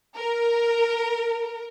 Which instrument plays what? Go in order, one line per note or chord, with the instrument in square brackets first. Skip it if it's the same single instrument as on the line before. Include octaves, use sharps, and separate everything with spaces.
[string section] A#4